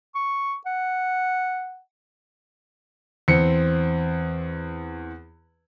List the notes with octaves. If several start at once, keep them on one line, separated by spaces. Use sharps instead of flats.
C#6
F#5
E2 C4 C#7